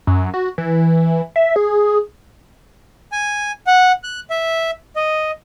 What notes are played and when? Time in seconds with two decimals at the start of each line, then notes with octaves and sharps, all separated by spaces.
0.07 F#2
0.34 F#4
0.58 E3
1.36 E5
1.56 G#4
3.12 G#5
3.67 F#5
4.04 F#6
4.30 E5
4.96 D#5